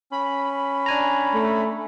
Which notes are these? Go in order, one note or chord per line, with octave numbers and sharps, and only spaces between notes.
C#4 B5
D4 G#5 A#5
A3